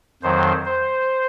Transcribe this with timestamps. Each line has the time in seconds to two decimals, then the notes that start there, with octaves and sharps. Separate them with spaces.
0.22 F2 D#3 F#3 C5
0.66 C5